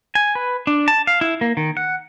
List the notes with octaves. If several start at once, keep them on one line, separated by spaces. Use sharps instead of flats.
G#5
B4
D4
A5
F5
E4
A#3
D#3
F#5